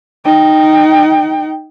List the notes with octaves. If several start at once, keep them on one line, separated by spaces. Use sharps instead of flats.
D#4 G5